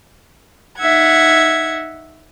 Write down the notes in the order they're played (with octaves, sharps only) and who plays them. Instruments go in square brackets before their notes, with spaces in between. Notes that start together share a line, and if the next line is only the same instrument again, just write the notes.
[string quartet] D#4 E5 F#5 G#6